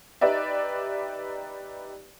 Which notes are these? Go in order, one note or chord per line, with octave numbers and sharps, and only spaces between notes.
D#4 G4 B4 D5 E5